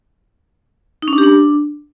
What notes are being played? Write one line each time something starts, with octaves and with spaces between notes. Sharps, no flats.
D#4
C#4
D4
G4
D4